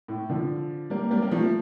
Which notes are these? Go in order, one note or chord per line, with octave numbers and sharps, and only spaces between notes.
A2
D3 F3
G3 A#3
G3 A#3
A#3
F3 A3